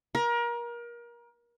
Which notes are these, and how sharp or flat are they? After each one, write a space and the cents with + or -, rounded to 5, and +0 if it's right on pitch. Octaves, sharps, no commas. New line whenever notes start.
A#4 +30